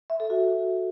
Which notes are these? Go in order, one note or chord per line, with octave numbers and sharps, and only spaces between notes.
E5
A4
F#4